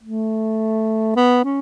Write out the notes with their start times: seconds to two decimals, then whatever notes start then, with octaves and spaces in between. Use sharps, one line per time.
0.03 A3
1.16 B3
1.44 C#4